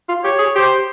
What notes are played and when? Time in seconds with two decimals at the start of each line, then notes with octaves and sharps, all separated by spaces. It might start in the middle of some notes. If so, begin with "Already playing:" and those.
0.09 F4
0.24 G4 C#5
0.39 G#4
0.55 G4 C5